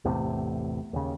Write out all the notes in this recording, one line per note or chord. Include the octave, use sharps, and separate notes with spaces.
A1 E2 A2 C3
D#2 C#3